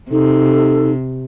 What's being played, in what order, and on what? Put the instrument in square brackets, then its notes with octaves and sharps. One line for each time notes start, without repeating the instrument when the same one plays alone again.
[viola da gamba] C3 [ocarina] D#4 [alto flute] A4